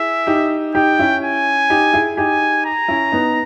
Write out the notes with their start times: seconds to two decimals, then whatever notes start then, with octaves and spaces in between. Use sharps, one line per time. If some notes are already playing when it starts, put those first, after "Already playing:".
Already playing: E4 G#4 E5
0.27 D#4 G4
0.75 D#4 G4 G5
0.99 C#4 E4
1.23 G#5
1.70 D#4 G4
1.94 E4 G#4
2.17 D#4 G4 G#5
2.65 A#5
2.88 C#4 E4
3.12 B3 D#4